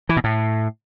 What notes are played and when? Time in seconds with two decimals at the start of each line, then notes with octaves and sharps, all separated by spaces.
0.09 E3
0.17 B2
0.24 A2